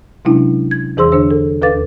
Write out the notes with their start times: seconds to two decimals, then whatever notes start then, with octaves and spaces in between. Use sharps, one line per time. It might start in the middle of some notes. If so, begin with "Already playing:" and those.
0.25 C3 F#3 G#3 C#4 D4 E4
0.71 G#6
0.97 E2 E3 G#4 C5 C6 E6
1.12 D3 D4 C5 E6
1.31 A4
1.62 D#2 A4 B4 F5 D6 A6